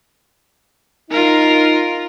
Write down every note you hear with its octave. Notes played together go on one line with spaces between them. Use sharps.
D#4 F4 A#4